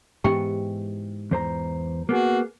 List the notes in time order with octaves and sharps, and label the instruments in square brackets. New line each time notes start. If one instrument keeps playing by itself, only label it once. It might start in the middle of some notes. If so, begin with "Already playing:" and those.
[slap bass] G#2 E3 B3 [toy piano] G4 G5
[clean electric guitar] E2 C5 A#5
[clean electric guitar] A#3 B3 G#4 [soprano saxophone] F#4